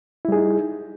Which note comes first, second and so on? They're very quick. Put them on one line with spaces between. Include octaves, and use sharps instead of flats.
E4 G3 G#4 D#4